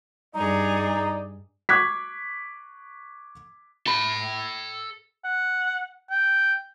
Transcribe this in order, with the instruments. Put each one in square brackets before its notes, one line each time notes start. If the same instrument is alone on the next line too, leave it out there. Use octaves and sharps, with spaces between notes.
[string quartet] G2 G#4 [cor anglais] D#4 [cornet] D5 [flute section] A#5
[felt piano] C#6 D6 F#6 G#6 B6
[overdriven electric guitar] A4 B5
[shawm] F#5
G5